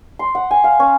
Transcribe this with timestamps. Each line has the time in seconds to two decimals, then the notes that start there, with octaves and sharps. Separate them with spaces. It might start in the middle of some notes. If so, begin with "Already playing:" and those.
0.19 C6
0.35 F#5
0.51 G#5
0.64 F5
0.80 C#4